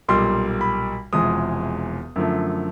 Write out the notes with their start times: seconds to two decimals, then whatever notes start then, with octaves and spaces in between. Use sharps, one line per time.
0.08 B1 A#2 G3 C6
0.61 B5
1.13 E1 E2 C3 F3 G#3 D#6
2.16 F#2 D3 F3 A3